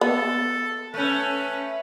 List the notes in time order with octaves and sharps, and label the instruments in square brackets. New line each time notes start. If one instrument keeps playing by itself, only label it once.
[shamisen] B3 [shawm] A4
[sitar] A3 C#4 [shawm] B4